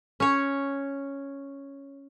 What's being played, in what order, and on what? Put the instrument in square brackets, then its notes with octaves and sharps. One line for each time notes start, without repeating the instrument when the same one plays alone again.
[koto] C#4 C#5